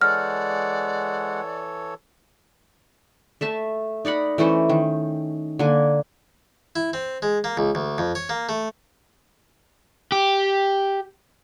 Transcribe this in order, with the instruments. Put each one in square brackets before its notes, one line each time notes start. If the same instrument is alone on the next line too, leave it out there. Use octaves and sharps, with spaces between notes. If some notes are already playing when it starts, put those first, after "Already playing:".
[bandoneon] E3 A4 C#5 [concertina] G#3 F#5 [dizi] D5 [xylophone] F6
[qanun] A3 E5 A5
D#4 D5 F#5 B5
E3 A3 C#4 C5
D#3
D3 A#3 G#5
[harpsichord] E4
C4
G#3
A#3
C#2
D2
F2
C#5
A#3
A3
[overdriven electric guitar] G4